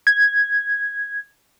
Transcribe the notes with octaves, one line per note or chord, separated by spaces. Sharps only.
G#6